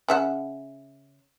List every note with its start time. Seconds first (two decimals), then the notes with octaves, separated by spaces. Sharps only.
0.09 C#3 E5 F#5